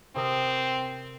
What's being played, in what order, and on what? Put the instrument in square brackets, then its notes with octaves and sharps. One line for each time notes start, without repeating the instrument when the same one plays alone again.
[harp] C3 A#4 D#6 [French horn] C4